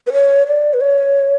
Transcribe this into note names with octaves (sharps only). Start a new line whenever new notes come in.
B4
C#5
D5
B4
C#5